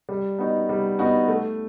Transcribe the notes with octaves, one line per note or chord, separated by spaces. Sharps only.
G3
B3 D#4 F#4
G3
B3 D#4 F#4
A3